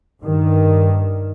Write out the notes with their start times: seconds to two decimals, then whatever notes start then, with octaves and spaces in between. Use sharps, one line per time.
0.21 G2 D#3